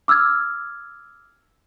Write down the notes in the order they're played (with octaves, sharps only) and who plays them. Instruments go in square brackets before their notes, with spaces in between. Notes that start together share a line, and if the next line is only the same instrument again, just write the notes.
[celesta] D6 E6 F6 G#6